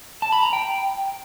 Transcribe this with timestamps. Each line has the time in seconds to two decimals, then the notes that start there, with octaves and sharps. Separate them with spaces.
0.22 A5
0.32 B5
0.43 A#5
0.53 G5